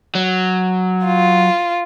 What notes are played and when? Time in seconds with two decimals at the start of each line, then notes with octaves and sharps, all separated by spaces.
0.15 F#3
1.06 F4